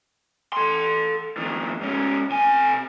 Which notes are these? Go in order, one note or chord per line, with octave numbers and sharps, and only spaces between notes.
A4 C6
F2 D#3
G#2 C#4
C3 G#5